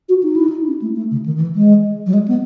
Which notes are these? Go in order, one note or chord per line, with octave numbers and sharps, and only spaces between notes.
F#4
D#4
E4
D#4
C#4
A3
A3
C#3
D#3
D#3
E3
G#3
F#3
G#3
B3